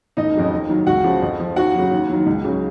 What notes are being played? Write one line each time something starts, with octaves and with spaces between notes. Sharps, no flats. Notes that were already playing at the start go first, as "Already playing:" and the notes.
F1 D#4 D#5
F2 C#3 F#3
D#2
D#3 F#3
C#2 F#4 F#5
C#3 F3
F2
F3
D#2 F#4 F#5
C#3 F#3
D#2
D#3 F#3
C#2
C#3 F#3